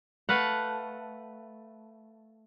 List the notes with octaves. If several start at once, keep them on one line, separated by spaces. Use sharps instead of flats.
A3 B4 F5 F#5